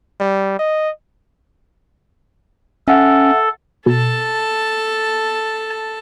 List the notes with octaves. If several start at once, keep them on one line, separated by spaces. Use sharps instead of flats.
G3
D#5
C#4 A4 E5 F#5
B2 A4 A5